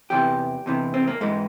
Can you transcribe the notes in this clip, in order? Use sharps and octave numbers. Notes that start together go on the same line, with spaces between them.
E2 C3 E3 G4
E2 C3 E3
C4
A#3
G#2 E3 G#3